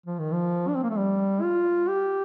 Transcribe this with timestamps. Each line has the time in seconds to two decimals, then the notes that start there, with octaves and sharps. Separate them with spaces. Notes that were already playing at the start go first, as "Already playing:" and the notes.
0.06 F3
0.19 D#3
0.32 F3
0.68 D4
0.75 C4
0.83 A#3
0.90 A3
0.97 G3
1.42 F4
1.87 G4